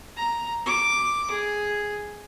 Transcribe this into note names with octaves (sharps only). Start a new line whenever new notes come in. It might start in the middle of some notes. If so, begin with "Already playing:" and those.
A#5
D6
G#4